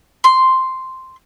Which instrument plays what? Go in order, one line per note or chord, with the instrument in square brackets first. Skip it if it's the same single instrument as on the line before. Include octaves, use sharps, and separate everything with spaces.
[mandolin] C6